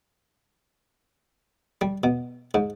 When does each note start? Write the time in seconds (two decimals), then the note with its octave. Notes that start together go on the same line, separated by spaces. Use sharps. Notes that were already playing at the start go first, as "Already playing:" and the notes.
1.81 G3
2.04 B2
2.54 G#2